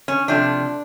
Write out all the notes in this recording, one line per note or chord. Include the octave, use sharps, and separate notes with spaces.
C#4
C3 F3 A3 D4